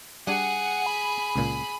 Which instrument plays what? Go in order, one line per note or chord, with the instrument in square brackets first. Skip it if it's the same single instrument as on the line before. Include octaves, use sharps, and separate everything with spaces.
[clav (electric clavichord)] G3 D4 G#5 [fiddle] G#4 [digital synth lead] F#5
[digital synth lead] B5
[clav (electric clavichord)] C#2 A#2